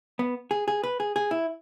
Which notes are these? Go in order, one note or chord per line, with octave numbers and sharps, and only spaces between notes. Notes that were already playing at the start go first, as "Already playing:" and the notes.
B3
G#4
G#4
B4
G#4
G#4
E4